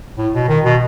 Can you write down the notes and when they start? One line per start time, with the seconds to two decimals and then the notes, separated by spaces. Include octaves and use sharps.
0.18 A2
0.34 B2
0.49 D#3
0.65 B2